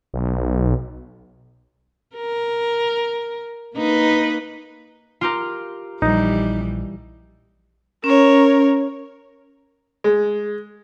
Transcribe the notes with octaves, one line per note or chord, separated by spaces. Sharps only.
B1
A#4
A#3 D#4 B4
F4 G4 A#4
A#1 E3 G3 D#4
C#4 A#4 C#5
G#3